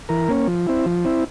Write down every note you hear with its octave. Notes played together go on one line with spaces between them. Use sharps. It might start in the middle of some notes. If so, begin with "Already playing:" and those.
E3 A#4
A#3 C#4
F3
C4 E4
F3
C4 E4